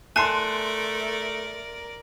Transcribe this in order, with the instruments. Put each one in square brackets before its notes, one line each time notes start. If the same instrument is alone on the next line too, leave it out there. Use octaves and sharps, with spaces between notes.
[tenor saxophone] A3 [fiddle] A#4 D5 [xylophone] G#5 A5 C7 [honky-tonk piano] C6 F#6